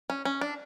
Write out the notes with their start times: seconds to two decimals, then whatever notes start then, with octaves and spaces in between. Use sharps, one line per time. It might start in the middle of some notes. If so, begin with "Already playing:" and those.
0.10 C#4
0.25 C#4
0.41 D4